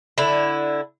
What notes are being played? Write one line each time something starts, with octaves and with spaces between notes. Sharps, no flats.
D3 E4